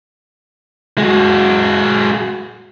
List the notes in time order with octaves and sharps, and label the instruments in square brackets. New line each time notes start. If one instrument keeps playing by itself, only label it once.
[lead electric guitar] G#3 F#4